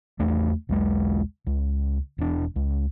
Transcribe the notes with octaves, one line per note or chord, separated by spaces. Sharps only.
E2 A3 D4
B1 E2 G#3
C#2
E1 D4
C#2